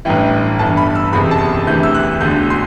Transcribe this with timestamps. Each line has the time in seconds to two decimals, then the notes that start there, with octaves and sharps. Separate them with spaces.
0.05 A1 G2 E3 G5
0.59 G1 G2 E3 A5
0.77 B5
0.95 E6
1.13 F#1 E2 C3 B5
1.31 A5
1.66 D2 C3 E3 G6
1.83 E6
1.94 F#6
2.21 E1 D2 D3 G6
2.50 C6